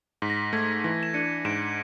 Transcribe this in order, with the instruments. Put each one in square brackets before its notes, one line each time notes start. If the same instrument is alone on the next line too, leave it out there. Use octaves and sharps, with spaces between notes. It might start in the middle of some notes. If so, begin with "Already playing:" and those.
[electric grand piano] G#2 [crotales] B6
[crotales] A#6
B6
[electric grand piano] A3 [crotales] G#6
[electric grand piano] E3 [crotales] A#6
[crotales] E7
[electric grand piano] D4 [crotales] C#7 D#7
[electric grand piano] G#2 [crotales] D7 E7